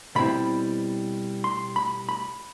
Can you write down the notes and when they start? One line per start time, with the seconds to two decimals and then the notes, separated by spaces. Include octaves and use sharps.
0.15 B2 G3 C4 E4 B5
1.44 C6
1.76 B5
2.09 B5